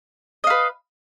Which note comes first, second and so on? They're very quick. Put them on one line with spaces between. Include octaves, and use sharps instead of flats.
D#5 F5 B4